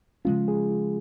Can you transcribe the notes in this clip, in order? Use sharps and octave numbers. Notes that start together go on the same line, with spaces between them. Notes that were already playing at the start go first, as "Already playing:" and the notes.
C#3 F3 G#3 C#4 F4
G#4
F4